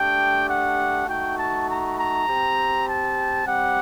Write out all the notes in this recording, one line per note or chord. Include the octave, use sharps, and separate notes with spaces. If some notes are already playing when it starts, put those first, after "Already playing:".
Already playing: A3 D4 G4 G5
F#5
A3 D#4 F#4 G5
A5
A#5
A#5
C4 G4
A5
G3 C4 G4 F#5